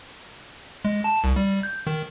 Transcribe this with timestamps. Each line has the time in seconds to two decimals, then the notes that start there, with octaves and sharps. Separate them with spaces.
0.85 G#3
1.04 A5
1.24 C2
1.36 G3
1.63 G6
1.87 D#3